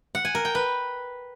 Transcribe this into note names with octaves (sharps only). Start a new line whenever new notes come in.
F#5
G#5
A#4
G5
B4